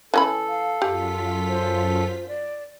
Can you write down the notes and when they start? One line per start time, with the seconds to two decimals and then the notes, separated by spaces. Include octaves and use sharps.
0.14 E3 C#4 A4 B5
0.49 F5
0.82 F#2 F4 G4 B6
1.48 C5
2.28 D5